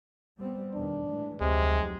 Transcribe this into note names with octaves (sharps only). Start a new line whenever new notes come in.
G3 B3 C4
E2 B2 D#3 D4
A2 E3 G#3
F1 D2 C3 F#3 G#3